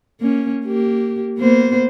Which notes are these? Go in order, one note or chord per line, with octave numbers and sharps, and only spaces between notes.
A#3 C#4
A#3 G4
A#3 B3 C5